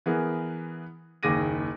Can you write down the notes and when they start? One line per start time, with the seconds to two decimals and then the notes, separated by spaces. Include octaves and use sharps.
0.06 E3 B3 G#4 A#4
1.23 F#1 D#2 G#4 D6 A#6 D#7